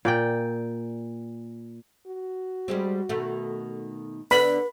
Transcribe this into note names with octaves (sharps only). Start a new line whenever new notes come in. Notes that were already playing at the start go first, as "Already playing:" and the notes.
A#2 D5 G5
F#4
G3 G#3 C4
B2 D#3 A3
D3 B3 D4 B4 B5